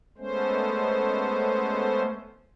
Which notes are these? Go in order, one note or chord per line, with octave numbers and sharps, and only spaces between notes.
G#3 A3 B3 C#4 C5